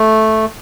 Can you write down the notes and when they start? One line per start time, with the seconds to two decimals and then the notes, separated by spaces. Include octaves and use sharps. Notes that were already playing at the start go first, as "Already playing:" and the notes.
Already playing: A3